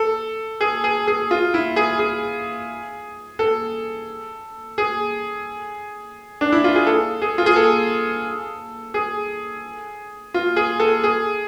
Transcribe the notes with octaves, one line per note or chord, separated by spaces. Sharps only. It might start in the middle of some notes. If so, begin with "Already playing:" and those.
Already playing: A4
G#4
G#4
G#4
F4
E4
G#4
G#4
A4
G#4
D4
E4
F4
G#4
A4
G#4
F4
G#4
A4
G#4
F4
G#4
A4
G#4